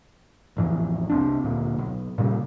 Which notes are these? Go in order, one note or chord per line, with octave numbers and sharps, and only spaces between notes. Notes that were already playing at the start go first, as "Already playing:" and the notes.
A1 F2 E3
C2 C4 D4
D2 A#2
B1
A#2 C#3 G3